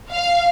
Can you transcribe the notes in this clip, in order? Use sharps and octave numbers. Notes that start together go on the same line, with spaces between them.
F5